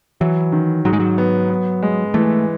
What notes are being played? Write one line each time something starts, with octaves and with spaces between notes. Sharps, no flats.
E3 F#3
D#3
G#2 F#3
G#3
F#3
B3
B3
G#3
E3 A3